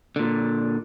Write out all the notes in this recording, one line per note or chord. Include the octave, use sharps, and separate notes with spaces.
A#2 D3